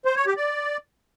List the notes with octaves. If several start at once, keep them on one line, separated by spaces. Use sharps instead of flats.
C5
C#5
G4
D5